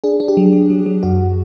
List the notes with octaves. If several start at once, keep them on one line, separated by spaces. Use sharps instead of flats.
D4 G#4
D4
G4
F#3
F#3
F#3
F#3
F#2 F#4